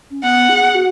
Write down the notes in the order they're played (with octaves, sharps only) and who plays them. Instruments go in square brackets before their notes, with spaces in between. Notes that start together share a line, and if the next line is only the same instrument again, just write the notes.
[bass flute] C#4
[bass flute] B3 [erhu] F#5
[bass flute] G#4
F#4